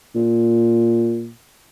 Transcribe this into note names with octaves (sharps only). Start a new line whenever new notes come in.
A#2